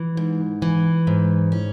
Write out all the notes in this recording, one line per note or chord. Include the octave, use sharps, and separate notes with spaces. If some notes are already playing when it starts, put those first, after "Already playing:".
Already playing: E3
G#2
E3
G#2
C#4